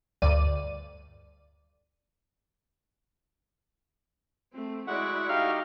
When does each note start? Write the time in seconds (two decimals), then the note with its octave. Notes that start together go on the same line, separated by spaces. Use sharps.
0.22 D2 G2 D5 D#7
4.53 A3 C4
4.87 G#3 E4 F#4 D5 E5 F#5 C#6
5.29 D#4 G4 F5